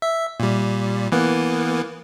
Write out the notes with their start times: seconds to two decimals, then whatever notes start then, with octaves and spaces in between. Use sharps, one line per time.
0.02 E5
0.40 A#2 G3
1.12 E3 A#3 B3